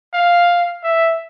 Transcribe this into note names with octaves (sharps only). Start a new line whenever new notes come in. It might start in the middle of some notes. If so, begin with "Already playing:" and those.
F5
E5